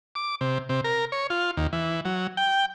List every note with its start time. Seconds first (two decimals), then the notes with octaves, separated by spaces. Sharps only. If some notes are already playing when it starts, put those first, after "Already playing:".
0.15 D6
0.41 C3
0.69 C3
0.84 A#4
1.12 C#5
1.30 F4
1.57 D#2
1.73 E3
2.05 F#3
2.37 G5